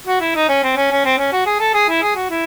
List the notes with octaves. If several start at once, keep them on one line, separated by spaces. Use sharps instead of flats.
F#4
E4
D#4
C#4
C4
C#4
C#4
C4
C#4
F#4
G#4
A4
G#4
E4
G#4
F#4
E4